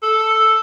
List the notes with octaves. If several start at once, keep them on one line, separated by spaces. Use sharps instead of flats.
A4